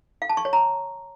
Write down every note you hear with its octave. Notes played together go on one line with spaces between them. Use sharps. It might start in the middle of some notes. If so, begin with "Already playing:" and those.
F5
A5
C#6
C#5
A#5